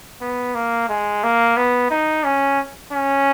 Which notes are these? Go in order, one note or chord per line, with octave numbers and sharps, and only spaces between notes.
B3
A#3
G#3
A#3
B3
D#4
C#4
C#4